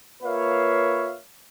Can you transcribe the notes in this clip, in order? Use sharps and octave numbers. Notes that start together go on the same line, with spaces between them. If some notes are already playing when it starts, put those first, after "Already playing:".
A#3 F4 B4 C#5 E5 F5